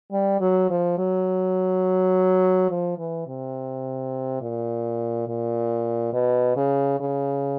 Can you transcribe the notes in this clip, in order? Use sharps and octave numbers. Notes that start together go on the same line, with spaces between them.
G3
F#3
F3
F#3
F3
E3
C3
A#2
A#2
B2
C#3
C#3